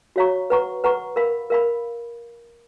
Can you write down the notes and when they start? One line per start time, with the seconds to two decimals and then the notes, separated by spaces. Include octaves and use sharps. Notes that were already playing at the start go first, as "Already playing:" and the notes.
0.16 F#4 C#5 F5 A#5 C#6
0.50 B4 F#5 A#5 C#6
0.84 B4 F#5 A#5 C#6
1.16 A#4 F5 B5
1.50 A#4 F5 B5